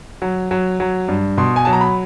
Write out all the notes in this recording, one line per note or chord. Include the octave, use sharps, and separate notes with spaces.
F#3
F#3
F#3
G2
B2 C6
G#5
F#3 A5
A#5
B5